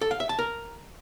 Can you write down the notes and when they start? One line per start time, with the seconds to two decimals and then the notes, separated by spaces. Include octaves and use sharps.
0.01 A4
0.11 F5
0.20 E5
0.29 A5
0.39 A#4